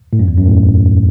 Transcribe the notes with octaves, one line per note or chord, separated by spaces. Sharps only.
A2
F#2
E2
F#2
A2